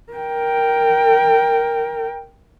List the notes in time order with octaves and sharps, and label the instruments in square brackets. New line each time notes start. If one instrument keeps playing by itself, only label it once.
[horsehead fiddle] A#4 G5